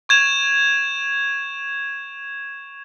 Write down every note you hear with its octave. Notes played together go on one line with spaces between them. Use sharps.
C#6 G#6 E7 F7